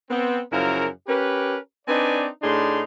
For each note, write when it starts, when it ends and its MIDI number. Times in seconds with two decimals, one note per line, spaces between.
0.10 0.40 59
0.10 0.40 60
0.52 0.87 42
0.52 0.87 49
0.52 0.87 53
0.52 0.87 64
0.52 0.87 70
1.08 1.57 61
1.08 1.57 67
1.08 1.57 70
1.08 1.57 71
1.87 2.28 60
1.87 2.28 62
1.87 2.28 63
1.87 2.28 71
1.87 2.28 74
1.87 2.28 80
2.43 2.83 45
2.43 2.83 62
2.43 2.83 63
2.43 2.83 68
2.43 2.83 84